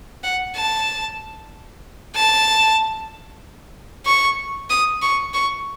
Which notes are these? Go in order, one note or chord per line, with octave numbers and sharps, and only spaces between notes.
F#5
A5
A5
C#6
D#6
C#6
C#6